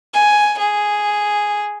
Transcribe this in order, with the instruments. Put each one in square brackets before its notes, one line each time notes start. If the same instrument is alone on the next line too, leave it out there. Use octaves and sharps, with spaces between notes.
[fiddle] G#5
G#4